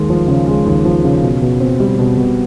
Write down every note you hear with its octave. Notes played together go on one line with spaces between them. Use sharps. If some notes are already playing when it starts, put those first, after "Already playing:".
Already playing: D#2 G#3
F3
C#3
G#3
D#2
F3
C#3
B2
B2
C4
G3
B2
B2